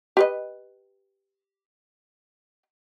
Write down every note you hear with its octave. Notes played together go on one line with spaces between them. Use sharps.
G4 B4 D#5